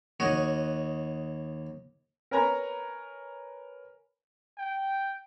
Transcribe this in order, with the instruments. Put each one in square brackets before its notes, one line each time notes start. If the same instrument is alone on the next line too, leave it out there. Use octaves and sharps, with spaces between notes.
[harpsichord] D#2 F#4 C#5 D#5
[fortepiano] A#4 B4 C#5 G#5 A#5 B5
[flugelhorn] G5